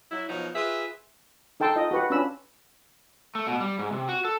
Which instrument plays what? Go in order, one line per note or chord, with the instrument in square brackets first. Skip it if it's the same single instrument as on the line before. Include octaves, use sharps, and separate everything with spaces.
[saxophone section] F#3 E4
B2 F3 F#3 D#4
F4 G#4 B4 E5
[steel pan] D#4 A4 G5 A5 C6
D#4 F4 D#5
F#4 G4 B4 F#5
C#4 D4 F4 B4 B5 E6
[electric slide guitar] A3
B2
G3
G#2
C3
F#4
A4